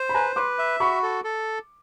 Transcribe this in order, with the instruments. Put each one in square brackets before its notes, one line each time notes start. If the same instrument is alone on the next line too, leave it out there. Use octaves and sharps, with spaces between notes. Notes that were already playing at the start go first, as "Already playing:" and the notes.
Already playing: [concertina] C5
[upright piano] B5
[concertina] B4 [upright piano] G#5 A#5
[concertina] B4 [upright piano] C6 D6
[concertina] E5
[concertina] F#4 [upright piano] B5 C#6
[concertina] A4
A4